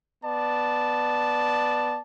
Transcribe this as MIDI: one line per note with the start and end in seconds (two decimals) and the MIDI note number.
0.25 2.00 59
0.25 2.00 74
0.25 2.00 81